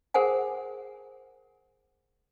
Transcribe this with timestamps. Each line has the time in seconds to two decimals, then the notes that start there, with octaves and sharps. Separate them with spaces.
0.14 G#4 A#4 C5 F#5 G#5